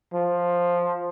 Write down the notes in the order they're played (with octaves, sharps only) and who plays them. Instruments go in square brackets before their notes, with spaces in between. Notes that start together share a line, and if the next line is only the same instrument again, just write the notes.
[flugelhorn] F3